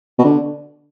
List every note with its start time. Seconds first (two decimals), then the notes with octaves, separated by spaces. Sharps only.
0.18 B2
0.24 D3